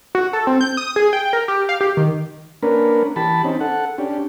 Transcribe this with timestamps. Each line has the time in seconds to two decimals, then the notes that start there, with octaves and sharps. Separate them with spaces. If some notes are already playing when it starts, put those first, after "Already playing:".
0.15 F#4
0.33 A4
0.47 C4
0.61 G6
0.77 D#6
0.96 G#4
1.13 G5
1.33 A#4
1.48 G4
1.69 F5
1.81 G4
1.97 D#3
2.63 A#3 C#4 D4 A#4 B4
3.16 E3 G4 A5 B5
3.45 C4 C#4 D#4
3.60 A4 F#5
3.98 C#4 D4 G4